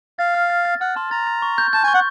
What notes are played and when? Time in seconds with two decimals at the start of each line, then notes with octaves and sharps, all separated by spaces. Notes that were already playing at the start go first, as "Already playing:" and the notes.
0.19 F5 A6
0.34 F6
0.50 A6
0.65 A6
0.81 F#5 F6
0.96 A5 C6
1.11 A#5 A6
1.27 A6
1.42 C#6
1.58 G6
1.73 A5 G6
1.84 G#5 C#6
1.94 F#5